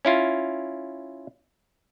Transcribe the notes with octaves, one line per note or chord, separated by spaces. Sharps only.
C#4 E4 F4